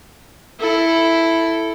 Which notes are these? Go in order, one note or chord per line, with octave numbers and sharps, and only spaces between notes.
E4 A4